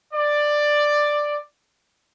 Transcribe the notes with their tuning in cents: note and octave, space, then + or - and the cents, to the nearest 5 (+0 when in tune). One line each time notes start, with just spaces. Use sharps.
D5 +10